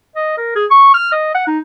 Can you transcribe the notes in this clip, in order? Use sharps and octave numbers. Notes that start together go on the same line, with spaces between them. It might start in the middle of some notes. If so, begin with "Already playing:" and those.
D#5
A#4
G#4
C#6
F6
D#5
F#5
D#4